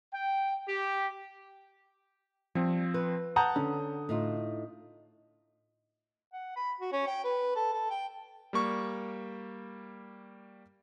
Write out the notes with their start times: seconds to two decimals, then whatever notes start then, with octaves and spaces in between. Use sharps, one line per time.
0.13 G5
0.68 G4
2.55 F3 G3 C4
2.94 B4
3.36 F#5 A5 A#5 D#6 G6
3.56 D3 C#4
4.09 A2 D#4 F4
6.33 F#5
6.56 B5
6.80 F#4
6.92 C#4
7.07 G5
7.24 B4
7.56 A4
7.73 A4
7.90 G5
8.53 G3 A#3 C#6